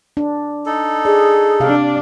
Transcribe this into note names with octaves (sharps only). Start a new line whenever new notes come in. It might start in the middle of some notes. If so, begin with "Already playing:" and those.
D4
D#4 A4
G#4 D5
C3 D4 G4 D5 F5